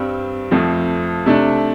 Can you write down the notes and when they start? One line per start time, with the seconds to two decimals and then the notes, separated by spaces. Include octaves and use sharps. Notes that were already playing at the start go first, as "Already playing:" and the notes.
Already playing: G2 G3 C4
0.51 F2 F3 A3 C4
1.26 C3 A3 D4